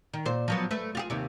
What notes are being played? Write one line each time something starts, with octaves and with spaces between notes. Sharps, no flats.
D#3
A#2 C5
F3 F#3 B3
A3 B4
F4 G4 G#4
D#2 C3